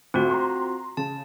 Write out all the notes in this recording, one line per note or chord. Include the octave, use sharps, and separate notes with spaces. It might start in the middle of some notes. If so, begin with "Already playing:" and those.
D2 C4 F4 F#4
A#5 C6
C#3 A5